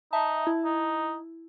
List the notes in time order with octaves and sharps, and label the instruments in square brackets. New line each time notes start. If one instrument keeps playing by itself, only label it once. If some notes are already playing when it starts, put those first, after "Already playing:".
[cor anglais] D#4 [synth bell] E5 A5
[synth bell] E4
[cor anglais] D#4